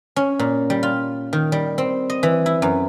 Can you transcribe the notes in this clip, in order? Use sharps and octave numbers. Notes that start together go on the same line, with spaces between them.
C#4
A#2
G3
F4
D#3
G3
C4
D#5
E3
E4
F#2